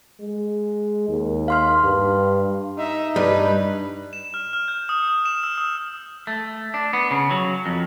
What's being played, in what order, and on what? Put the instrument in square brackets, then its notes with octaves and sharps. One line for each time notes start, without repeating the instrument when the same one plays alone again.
[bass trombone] G#3
D#2
[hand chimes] F5 C6 F6
[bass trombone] G2
[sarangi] D#4 [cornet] E5
[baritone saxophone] G2 [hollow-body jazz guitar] G3 [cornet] B4
[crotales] E7
F6
F6
G6
D#6
D#6
E7
E6
D#6
[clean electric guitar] A3
D4
B3
C#3
F#3
F2